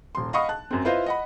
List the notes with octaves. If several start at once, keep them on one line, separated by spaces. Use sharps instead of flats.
D#1 C6
D#5 F5 F#5 B5 C#6 D#6
A5 F#6
F#2 C4
E4 F4 B4 C5 D#5 F5
D#5 F#5 B5